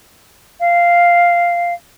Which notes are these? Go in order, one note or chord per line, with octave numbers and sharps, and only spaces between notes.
F5